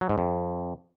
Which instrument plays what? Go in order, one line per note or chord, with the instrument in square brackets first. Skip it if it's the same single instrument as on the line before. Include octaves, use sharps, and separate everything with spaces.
[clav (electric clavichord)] F#3
G#2
F2